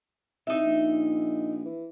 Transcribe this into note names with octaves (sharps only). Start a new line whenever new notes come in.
C2 D#4 E5
A#1
E3